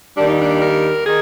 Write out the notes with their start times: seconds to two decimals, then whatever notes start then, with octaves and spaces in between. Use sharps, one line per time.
0.17 D#2 D#3 G3 D4
0.28 D#4
0.42 D4
0.62 A#4
1.06 D#3 G#4